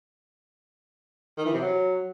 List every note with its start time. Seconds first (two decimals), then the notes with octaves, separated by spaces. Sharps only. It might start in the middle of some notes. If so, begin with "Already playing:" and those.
1.37 D#3
1.45 E3
1.53 C3
1.61 F#3